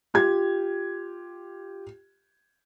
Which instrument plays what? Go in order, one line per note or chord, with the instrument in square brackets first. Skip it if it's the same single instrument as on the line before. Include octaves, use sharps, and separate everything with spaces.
[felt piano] F4 G4 G#6